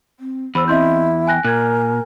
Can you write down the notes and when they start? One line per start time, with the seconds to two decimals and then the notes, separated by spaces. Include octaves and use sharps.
0.20 C4
0.55 E2 C5 B5 E6
0.68 C4 E4 D#5 C6 G6
1.27 G5 G#5 F#6 A#6
1.44 A#2 A#4 G#5 F#6 G#6